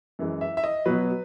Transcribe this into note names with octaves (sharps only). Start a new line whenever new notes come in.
F#2 E3 G#3
E5
E5
D#5
B2 F#3 B3 B4